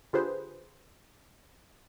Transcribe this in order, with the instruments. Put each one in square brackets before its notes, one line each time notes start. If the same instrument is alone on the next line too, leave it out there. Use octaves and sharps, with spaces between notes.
[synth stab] D3 F4 G4 G#4 B4 C5